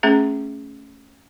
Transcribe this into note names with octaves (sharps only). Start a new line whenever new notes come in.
A3 C#4 G#4 E5